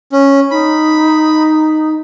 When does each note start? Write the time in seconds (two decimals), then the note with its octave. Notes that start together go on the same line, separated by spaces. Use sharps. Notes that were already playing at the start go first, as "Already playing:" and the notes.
0.13 C#4
0.51 D#4 B5